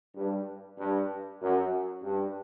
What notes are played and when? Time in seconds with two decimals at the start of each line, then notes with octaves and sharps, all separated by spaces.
0.15 G2
0.77 G2
1.41 F#2
2.02 G2